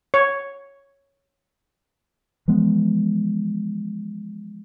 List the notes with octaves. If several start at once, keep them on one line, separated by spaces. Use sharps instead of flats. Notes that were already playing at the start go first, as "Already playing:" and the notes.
C#5
E3 F3 G#3 B3